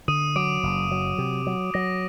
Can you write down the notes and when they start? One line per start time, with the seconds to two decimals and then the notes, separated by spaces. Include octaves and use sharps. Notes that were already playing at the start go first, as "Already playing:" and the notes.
0.08 D3 D#6 D#7
0.36 F#3 D6 D7
0.63 F#1
0.91 F#3
1.18 C3
1.47 F#3
1.74 F#3 A#6